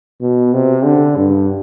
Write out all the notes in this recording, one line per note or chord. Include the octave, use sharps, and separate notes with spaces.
B2
C3
D3
G2